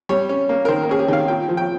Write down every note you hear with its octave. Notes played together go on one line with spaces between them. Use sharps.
G3 C#5
C#4
A#3
A#4
D#3 C5
A#4
C#4 G#4
G4
D#3 F5
A#2 G5
F3
G5